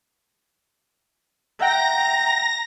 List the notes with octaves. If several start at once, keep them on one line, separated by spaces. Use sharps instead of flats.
E5 F#5 G5 A#5 A#6